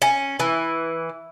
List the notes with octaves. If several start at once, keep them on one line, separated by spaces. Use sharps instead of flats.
C#4
E3